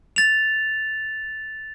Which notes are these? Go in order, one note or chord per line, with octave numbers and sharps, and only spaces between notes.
A6 F7